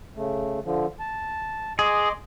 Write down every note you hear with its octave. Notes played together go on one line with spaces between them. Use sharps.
C#3 A3
D3 F3
A5
G#4 D#5 C6 D6